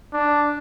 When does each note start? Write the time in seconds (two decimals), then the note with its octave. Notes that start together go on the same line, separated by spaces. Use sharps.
0.13 D4